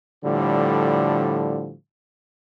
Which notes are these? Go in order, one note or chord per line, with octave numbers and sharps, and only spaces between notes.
A2 D3 F3 G3